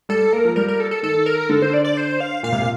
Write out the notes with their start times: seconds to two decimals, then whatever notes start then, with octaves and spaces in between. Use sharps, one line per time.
0.09 G3 A4
0.33 A#3 A#4
0.45 F3
0.56 G3 A#4
0.68 A#4
0.80 A4
0.91 A4
1.03 D#3 A4
1.26 A#4
1.49 D3 A4
1.62 C5
1.74 D5
1.85 D5
1.97 C5
2.20 F5
2.43 A#2 F5
2.52 C3
2.61 A#2